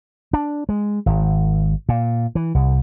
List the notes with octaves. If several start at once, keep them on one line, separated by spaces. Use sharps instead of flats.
D4
G#3
G#1
A#2
E3
C2